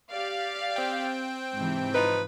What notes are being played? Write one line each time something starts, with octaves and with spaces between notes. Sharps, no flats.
G4 D5 F5
C4 G5
G#2 C3 E3
F3 D#4 B4